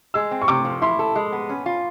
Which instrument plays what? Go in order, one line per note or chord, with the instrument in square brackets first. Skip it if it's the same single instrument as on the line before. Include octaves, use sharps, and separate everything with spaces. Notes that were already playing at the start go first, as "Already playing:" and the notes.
[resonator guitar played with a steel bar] G#3 [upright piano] E6
[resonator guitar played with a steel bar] C4
[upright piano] C#6
[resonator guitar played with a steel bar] C3 [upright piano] D6
[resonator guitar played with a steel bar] F3
[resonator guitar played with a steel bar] E4 [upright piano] C6
[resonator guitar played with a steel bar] A4
G#3
B3
C#4
F4